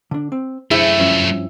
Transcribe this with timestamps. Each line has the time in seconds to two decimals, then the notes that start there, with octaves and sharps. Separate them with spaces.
0.11 D3 D4
0.32 C4
0.71 F#2 A3 E4 G#4 C5 G5
0.99 G2 F3 C#4